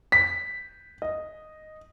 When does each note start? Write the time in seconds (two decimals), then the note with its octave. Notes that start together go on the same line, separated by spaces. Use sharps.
0.12 B6
1.02 D#5